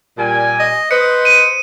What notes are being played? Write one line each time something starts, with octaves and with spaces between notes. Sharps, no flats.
A#2 G3 G#5
D#5
B4 C5 D#5 C#7
D#7